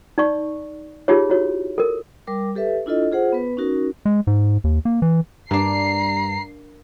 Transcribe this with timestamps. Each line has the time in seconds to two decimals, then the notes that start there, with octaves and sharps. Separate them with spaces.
0.18 D#4 D5 C#6
1.08 D#4 F4 G4 G#4 C#5
1.30 E4 F#4 C#5
1.78 A4 A#4
2.27 G3 A#4 D6
2.56 G4 A4 B4 E5
2.86 D4 E4 F4 A4 D#5
3.12 F4 G#4 C5 F#5
3.33 B3 B4
3.57 C#4 D#4 F#4 A#4
4.05 G#3
4.27 G#2
4.64 D#2
4.85 A#3
5.02 E3
5.51 G2 A#3 D4 A#5 C7